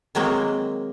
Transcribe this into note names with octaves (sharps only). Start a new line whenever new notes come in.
D#3 F#3 G#3 A#3 C4